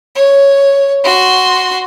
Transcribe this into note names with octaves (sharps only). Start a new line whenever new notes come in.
C#5
F#4 C6